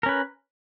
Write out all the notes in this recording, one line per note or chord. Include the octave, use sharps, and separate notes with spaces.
C#4 A#4 B4